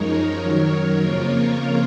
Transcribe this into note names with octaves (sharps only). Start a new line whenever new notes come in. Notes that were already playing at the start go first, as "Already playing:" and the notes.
Already playing: F#2 F3 G#3 D#4 A#4 C#5
F#2 D#3 F#3
F2 C#3 F3 A#3 F4